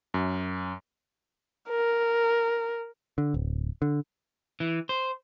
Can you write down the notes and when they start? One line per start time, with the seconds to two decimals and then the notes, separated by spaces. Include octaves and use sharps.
0.14 F#2
1.69 A#4
3.18 D3
3.34 D1
3.82 D3
4.60 E3
4.89 C5